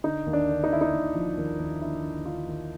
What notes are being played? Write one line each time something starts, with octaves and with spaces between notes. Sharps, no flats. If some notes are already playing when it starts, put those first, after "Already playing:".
D3 D#4
D#2
D4
D3
D#4
D3 E4
D#4
D#2
F3
D#2
D#2
D3 E4
D3
D3 F4
D#2